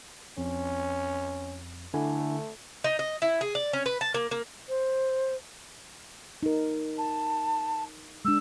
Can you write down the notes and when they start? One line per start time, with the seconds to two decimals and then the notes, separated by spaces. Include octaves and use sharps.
0.38 F2 C#4
1.94 D3 A3 E4 G#5
2.84 D#4
2.99 D#5
3.22 E4
3.41 G#4
3.55 D5
3.73 C#4
3.86 B4
4.01 A5
4.14 A#3
4.31 A#3
4.69 C5
6.43 D#4 A#4
6.98 A5
8.25 G#3 D4 E6